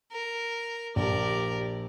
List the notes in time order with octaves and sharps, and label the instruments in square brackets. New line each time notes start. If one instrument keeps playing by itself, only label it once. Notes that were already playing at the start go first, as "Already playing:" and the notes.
[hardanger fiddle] A#4
[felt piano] A#1 A5 [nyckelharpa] G4 D5 [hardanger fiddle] A#4